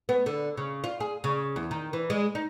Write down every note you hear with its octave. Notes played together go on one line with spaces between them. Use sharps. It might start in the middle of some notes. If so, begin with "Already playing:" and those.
B3
D3
C#3
F4
G#4
C#3
E2
D#3
E3
G#3
D#4